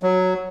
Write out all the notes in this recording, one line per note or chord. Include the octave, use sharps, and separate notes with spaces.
F#3